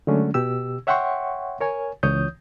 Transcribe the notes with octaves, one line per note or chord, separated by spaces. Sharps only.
D3 F#3 G#3 A3 C#4 D4
B2 G4 E6
C#5 E5 F#5 G5 C6 C#6
A#4 C#5 G#5
C#2 E3 C#5 D#6 G6